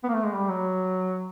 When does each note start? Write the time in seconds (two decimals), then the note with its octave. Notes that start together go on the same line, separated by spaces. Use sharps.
0.04 B3
0.09 A#3
0.14 A3
0.24 G#3
0.34 G3
0.49 F#3